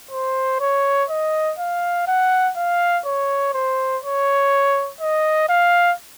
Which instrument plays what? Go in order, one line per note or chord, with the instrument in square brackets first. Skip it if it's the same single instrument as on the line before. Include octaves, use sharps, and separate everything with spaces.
[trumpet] C5
C#5
D#5
F5
F#5
F5
C#5
C5
C#5
D#5
F5